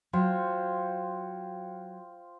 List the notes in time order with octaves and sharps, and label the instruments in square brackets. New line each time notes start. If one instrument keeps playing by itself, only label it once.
[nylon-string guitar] F#3 [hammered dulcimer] F4 C5 G5